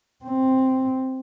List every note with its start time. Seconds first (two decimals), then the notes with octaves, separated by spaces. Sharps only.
0.25 C4